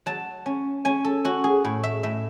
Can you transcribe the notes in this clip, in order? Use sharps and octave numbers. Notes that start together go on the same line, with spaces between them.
F#3 A5
C#4
C#4 G#5
A4
C#4 F#4
G#4
A2
E5
A2 E5